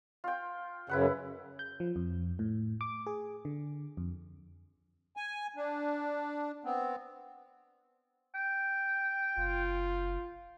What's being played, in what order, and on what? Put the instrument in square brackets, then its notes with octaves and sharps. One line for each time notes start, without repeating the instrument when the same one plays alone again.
[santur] F4 G5
[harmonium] F#2 C#3 [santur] E4 B4 F#5
[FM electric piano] G6
F3
F2
A2
D6
G#4
D3
F2
[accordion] G#5
D4
B3 C4
[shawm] G5
[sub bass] F#1 [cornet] F4